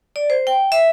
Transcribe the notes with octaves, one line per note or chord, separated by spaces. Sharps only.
D5
C5
G5
E5